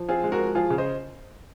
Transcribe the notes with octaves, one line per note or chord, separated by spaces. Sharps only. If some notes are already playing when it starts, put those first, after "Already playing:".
Already playing: F3
C4 F4 G#4
G#3
F#4 A#4
F3
F3 F4 G#4
C#3
C5 D#5